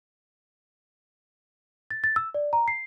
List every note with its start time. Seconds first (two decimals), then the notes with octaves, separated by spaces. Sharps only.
1.91 A6
2.04 A6
2.16 E6
2.34 D5
2.53 A#5
2.68 C7